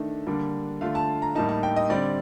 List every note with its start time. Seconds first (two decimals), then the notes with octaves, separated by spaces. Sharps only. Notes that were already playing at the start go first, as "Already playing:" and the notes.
Already playing: D#3 A3 D4
0.27 D3 G3 A#3 D4
0.81 D3 A3 D4 F4 F5
0.95 A5
1.22 A#5
1.35 A2 G3 A#3 D#4 A5
1.49 A5
1.63 G5
1.76 D#5
1.90 D3 G3 C4 D5